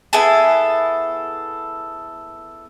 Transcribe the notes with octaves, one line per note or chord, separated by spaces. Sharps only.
B3 E4 G#4 A4